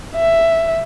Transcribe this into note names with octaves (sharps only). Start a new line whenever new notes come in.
E5